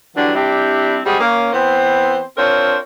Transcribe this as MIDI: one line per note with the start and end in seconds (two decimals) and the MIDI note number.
0.15 0.33 50
0.15 0.33 52
0.15 0.33 54
0.15 0.33 55
0.15 0.33 62
0.34 0.98 55
0.34 0.98 60
0.34 0.98 62
0.34 0.98 64
0.34 0.98 67
1.05 1.19 55
1.05 1.19 56
1.05 1.19 60
1.05 1.19 66
1.05 1.19 68
1.20 1.50 58
1.20 1.50 61
1.52 2.21 52
1.52 2.21 59
1.52 2.21 60
1.52 2.21 72
2.37 2.76 60
2.37 2.76 62
2.37 2.76 65
2.37 2.76 70
2.37 2.76 72
2.37 2.76 73